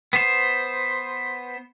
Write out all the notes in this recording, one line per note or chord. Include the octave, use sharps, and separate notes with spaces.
B3 C5